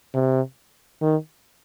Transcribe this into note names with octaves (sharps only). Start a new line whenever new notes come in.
C3
D#3